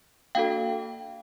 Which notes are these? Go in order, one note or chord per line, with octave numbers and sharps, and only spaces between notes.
A#3 D4 F#4 A4 F5 G5